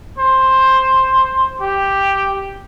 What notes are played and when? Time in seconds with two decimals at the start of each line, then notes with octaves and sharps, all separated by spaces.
0.18 C5
1.61 G4